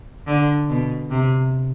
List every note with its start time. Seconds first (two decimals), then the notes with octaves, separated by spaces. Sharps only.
0.27 D3
0.69 B2
1.11 C3